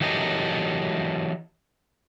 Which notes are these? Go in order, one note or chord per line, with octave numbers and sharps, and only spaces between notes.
E3 F#3 G4 A4 A#4 D#5